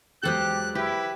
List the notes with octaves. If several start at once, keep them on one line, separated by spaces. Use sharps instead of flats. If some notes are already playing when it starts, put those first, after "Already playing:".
E2 F#3 G#3 G4 A4 C5 D#5 F#6
E4 G4 B4